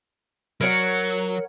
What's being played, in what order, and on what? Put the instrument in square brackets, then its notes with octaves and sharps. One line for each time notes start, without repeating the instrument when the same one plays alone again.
[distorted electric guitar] F#3 [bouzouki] A#4 C#5 F#5